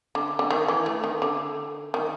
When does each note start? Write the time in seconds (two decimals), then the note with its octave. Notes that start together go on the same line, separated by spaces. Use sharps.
0.15 D3
0.39 D3
0.50 D#3
0.68 E3
0.86 A3
1.04 D#3
1.22 D3
1.94 D#3